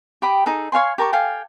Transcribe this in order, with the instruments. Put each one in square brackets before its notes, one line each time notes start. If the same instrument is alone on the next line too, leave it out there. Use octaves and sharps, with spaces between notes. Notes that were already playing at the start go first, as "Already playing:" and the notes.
[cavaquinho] G4 G5 B5 D#6
D#4 G#4 A4
C#5 F5 G#5 C6
G4 A#4 A5 C#6
A4 F5 G5 G#5